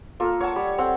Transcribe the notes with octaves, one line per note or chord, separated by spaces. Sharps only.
A#3 F4 A4 A#4
C#5 F#5 A5
G3
C4 A4 F#5